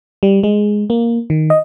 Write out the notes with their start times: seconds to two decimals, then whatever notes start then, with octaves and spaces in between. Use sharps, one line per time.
0.23 G3
0.43 G#3
0.90 A#3
1.30 D#3
1.50 D#5